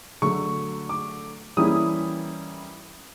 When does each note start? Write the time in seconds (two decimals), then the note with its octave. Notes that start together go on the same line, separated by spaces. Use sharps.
0.22 D3 F#3 A3 C#6
0.89 D6
1.57 E3 G3 A#3 C#4 E4 D#6